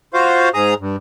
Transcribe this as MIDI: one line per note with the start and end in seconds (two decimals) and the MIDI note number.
0.14 0.49 65
0.14 0.49 66
0.14 0.49 72
0.14 0.49 77
0.54 0.74 44
0.54 0.74 68
0.54 0.74 82
0.54 0.74 87
0.80 0.96 43